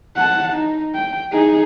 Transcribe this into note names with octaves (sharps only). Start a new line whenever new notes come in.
F#5 A5
D#4
G5
D#4 G#4